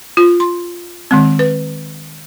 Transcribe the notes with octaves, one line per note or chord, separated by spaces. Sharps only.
F4
C6
D#3 G#3 C4
B4